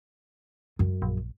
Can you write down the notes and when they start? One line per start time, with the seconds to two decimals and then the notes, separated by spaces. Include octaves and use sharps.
0.79 F#2
1.02 A#1